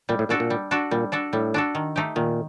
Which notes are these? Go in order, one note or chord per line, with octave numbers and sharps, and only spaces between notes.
A#2 G3
A2
A#2 D4 F#4 A4
A#2
G3
D4 F#4 A4
A#2 G3
D4 F#4 A4
A2 G3
D4 F#4 A4
D#3
A3 D#4 G4
A#2 D#3